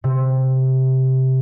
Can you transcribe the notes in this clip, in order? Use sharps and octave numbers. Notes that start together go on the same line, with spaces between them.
C3